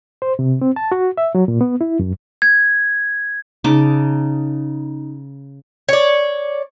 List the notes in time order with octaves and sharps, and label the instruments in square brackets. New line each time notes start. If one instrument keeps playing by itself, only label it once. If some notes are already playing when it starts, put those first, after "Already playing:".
[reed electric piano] C5
C3
C4
A5
F#4
E5
F#3
A#2
B3
E4
F#2
[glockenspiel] G#6
[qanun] C#3 D#4 A5 D6
[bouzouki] C#5 D5